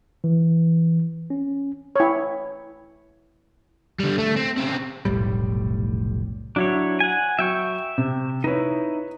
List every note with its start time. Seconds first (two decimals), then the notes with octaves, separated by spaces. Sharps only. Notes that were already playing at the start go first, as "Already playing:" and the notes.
0.24 E3
1.30 C#4
1.96 E4 C#5
3.99 D3 G3
4.18 A3
4.36 C4
4.58 C#3 C4
5.05 F1 B1 A2 G3
6.56 F#3 D4 E4 C#5
7.00 F#5 G#5
7.39 F#3 E5 G5 C#6
7.98 C3
8.44 D#4 E4 B4 C#5